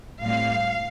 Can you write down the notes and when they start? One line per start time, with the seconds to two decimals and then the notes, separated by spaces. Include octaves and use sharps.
0.22 A2 G3 C4 F5